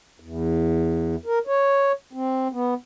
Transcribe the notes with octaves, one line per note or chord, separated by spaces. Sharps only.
E2
A#4
C#5
C4
B3